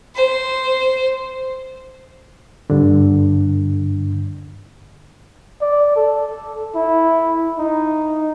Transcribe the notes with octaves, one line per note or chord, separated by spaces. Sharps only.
C5
G2 D3
D5
A4
E4
D#4